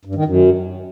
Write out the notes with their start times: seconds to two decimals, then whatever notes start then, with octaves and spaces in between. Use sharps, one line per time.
0.05 G2
0.15 D#3
0.25 F#2